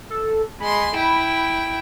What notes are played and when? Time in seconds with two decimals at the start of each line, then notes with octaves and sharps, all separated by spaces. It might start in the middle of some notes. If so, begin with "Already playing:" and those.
0.10 A4
0.60 G#3 B5 C6
0.95 E4 G5